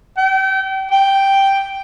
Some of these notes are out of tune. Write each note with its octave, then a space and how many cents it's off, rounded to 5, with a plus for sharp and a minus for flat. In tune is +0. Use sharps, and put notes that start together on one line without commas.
G5 -35
G5 +0